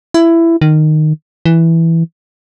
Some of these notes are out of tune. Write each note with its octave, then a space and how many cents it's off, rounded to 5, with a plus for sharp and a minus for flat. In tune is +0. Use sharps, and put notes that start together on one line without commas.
E4 +15
D#3 -15
E3 +0